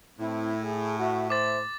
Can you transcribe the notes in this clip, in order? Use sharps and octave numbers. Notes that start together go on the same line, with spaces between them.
A2 C4 E4
G#4
F#4 E5
C5 D6 A6